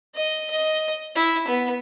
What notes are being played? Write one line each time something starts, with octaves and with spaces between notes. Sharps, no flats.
D#5
D#5
E4
B3